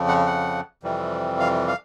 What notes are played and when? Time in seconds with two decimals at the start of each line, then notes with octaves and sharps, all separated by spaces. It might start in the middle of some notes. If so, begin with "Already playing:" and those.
Already playing: F2 C#3 F3
0.08 F#5
0.27 F#5
0.83 F2 C3 E3 G3
1.40 F5
1.68 F5